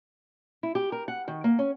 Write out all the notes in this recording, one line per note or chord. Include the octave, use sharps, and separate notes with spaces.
E4
G4
A#4
F#5
D#3
A#3
C#4